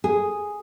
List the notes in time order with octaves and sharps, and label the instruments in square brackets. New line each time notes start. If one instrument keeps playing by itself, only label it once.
[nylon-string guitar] G#4